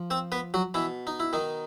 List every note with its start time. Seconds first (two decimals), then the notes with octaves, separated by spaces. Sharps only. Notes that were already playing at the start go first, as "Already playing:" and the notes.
Already playing: F3
0.11 C4 C5
0.32 B3 B4
0.54 F#3 F#4
0.74 B2 E3 E4
1.07 D#4
1.20 E4
1.33 D#3 D#4